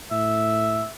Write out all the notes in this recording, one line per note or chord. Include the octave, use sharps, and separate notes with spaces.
A2 E5